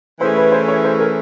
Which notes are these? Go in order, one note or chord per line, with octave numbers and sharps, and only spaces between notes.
E3 A3 C#4 E4 G#4 C5
B4
C5
C#5
C5
A#4